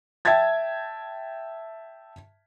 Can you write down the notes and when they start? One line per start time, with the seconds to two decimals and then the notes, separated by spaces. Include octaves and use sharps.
0.25 E5 G5 A5 G#6 A6